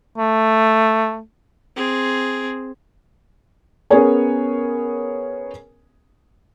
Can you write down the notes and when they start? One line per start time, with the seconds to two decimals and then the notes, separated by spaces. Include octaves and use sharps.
0.18 A3
1.76 C4 G#4
3.90 B3 C#4 G#4 A#4 C#5 G#5